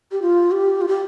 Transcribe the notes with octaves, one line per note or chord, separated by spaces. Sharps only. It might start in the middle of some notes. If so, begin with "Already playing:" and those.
G4
F4
G4
F4
G4